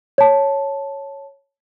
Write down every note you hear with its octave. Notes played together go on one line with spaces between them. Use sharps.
C#5 A5